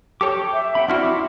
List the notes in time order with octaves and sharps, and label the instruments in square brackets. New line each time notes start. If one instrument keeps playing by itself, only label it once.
[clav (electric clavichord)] G4 A4 C#5 [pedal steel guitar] G5 D6
[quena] E5
[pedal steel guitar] F#5 G5 B5
[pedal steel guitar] C4 C6 F6 [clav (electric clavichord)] D4 E4 F#4
[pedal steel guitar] D6 E6